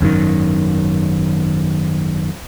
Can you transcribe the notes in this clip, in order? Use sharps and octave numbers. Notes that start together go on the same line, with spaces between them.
G#1 F#2 C3 D#3